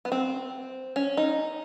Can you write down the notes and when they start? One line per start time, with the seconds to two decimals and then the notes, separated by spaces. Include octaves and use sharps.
0.05 B3
0.12 C4
0.96 C#4
1.17 D#4